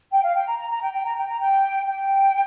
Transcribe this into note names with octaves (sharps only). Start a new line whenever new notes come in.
G5
F5
G5
A#5
A#5
A#5
G5
G5
A#5
G5
A#5
G5
G5